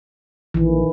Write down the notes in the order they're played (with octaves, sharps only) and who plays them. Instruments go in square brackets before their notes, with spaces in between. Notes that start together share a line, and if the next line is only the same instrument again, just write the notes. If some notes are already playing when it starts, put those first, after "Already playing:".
[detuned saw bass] A#1 [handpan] D#3 E3